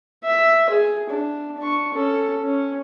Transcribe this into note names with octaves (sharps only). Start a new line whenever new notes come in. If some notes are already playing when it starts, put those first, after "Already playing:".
E5
G#4
D4
D4 C#6
C#4 A4
C#4